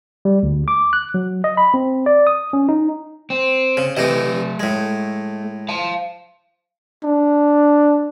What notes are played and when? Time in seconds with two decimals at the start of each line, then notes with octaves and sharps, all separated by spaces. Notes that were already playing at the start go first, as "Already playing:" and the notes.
0.25 G3
0.43 D2
0.68 D6
0.93 F#6
1.14 F#3
1.44 D#5
1.57 B5
1.74 C4
2.06 D5
2.27 D#6
2.53 C#4
2.69 D#4
3.30 C4
3.77 C#3
3.97 C3 E3 A3 D#4 D#5
4.60 A2 G#3
5.69 F5 A5
7.04 D4